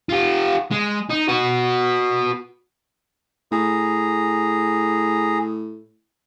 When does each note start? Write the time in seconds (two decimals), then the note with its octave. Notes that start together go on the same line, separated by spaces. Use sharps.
0.09 F4 G4
0.71 G#3
1.10 D#4
1.28 F#4 B4
3.52 A2 G#4 A#5